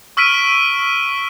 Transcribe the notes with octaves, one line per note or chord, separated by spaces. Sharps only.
C#6 E6 F6 B6 D7 D#7